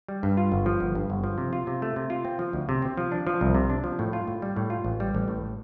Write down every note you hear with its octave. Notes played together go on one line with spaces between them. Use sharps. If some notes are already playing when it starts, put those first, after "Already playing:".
G3
G2
F4
G1
F3
G1
G2
G1
F3
C3
F4
C3
A3
C3
F4
C4
F3
D2
C3
C4
F3
D4
F3
C2
C3
D4
F3
A2
F4
A2
G3
A2
F4
A1
G3
A1
A2